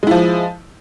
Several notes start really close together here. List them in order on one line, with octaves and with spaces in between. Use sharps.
G#3 E4 F3